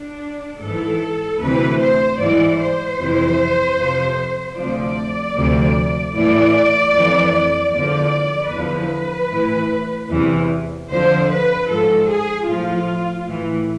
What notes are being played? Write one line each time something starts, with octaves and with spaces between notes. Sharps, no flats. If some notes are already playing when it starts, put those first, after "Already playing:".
Already playing: D4
G#2 E3 A4
D2 C3 E3 B4
C5
G#2 E3 D5
C5
F2 C3 E3
F2 C3 F3
D2 C3 F3 D5
D2 C3 F3
A2 E3 D5
F2 E3
E2 D3 F3 D5
E2 D3 F3 B4
A2 E3
E2 C3 E3
F2 D3 F3 C5
B4
G#2 F3 A4
G#4
A2 F3 F4
A2 E3